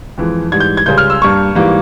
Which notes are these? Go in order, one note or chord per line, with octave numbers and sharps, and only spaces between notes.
F2 E3 G#3
G#2 E3 G3 G#6
G6
G#6
C#2 C#3 G3 G6
F6
E6
G2 G3 A#3 C#6
G#2 E3 G3 A#3